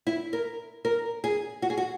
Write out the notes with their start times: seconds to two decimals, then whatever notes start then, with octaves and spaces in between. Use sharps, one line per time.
0.07 E4
0.33 A#4
0.85 A#4
1.24 G#4
1.62 F#4
1.70 G#4
1.77 F#4